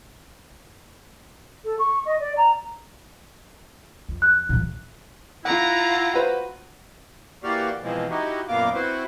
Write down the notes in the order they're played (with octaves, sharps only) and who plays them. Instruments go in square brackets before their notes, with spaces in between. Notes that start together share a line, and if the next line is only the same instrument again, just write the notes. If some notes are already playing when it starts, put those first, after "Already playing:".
[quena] A4
C#6
D#5
D5
A#5
[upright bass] F2
[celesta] F#6
[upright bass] A#2 E3
[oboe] E4 [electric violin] F4 A#5 [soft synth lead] F#5
[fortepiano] F#4 B4 C5
[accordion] E3 A#3 F#4 G4 D5 F5
B2 E3 F3 G#3 C4
D#4 E4 F#4 G4
F#2 A#2 A#3 B3 F5 D6
C4 E4 F#4 B4 C5